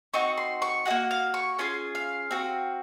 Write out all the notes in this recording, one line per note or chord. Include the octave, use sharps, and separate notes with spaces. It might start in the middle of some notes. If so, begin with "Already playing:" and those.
C4 D#4 F#4 C#6
C6
C#6
D#4 F#4 F#5
A#3
F5
C#6
C#4 F4 G#4 C6
F5
C4 F#4